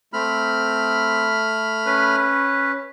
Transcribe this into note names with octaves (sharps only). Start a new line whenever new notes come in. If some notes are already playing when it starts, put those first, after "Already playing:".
A3 C4 B5 F6
C#4 B4